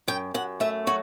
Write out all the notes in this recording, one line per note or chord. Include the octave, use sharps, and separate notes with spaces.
F#2 G5
F#2 F#5
A3 E5
F#3 F#4